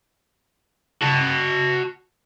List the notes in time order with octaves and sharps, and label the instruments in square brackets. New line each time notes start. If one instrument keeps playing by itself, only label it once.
[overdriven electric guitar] F#4 A5